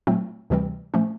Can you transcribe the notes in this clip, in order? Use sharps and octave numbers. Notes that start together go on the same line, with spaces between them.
A#2 F#3 A3 C4
D2 C3 E3 G3 C4
A#2 F3 A3 C#4